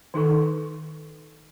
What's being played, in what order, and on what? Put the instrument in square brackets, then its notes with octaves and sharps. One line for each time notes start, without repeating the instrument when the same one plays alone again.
[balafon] D#3 D#4 A4 C#6